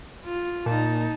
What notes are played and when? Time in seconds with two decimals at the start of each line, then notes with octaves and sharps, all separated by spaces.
0.24 F4
0.66 A#2 D#4 A5